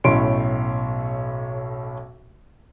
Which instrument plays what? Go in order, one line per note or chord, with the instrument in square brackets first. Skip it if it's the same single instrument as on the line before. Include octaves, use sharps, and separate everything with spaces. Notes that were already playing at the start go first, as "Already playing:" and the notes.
[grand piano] B1 A2 C#4 D#5 C6 D7